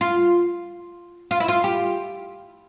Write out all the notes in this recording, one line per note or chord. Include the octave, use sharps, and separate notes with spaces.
F4
F4
E4
F4
G4